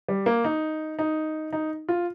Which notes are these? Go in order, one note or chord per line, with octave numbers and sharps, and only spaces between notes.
G3
A#3
D#4
D#4
D#4
F4